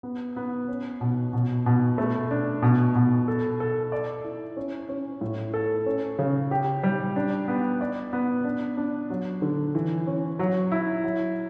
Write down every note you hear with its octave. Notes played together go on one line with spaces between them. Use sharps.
B3
B3
C#4
B2
B2
B2
A3
D4
B2
B2
A4
A4
D5
E4
C#4
C#4
A2
A4
C#4
C#3
G4
G3
D4
B3
D5
B3
D4
D4
F#3
D3
E3
C#4
F#3
E4
F#3